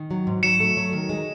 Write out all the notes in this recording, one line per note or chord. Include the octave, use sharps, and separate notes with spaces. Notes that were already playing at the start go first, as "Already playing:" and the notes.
Already playing: D#3
F#3
G#2
F#3 C#7 E7
A3
F#3
D#3
G#3